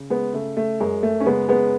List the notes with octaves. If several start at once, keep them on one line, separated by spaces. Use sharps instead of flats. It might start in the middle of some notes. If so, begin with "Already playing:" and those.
Already playing: C#3
G#3 B3
C#3 A3
A3
F#2 G#3
A3
C#4
C#3 G#3 B3
G#3 B3